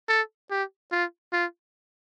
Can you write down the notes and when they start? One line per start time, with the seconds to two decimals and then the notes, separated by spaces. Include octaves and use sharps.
0.09 A4
0.51 G4
0.92 F4
1.33 F4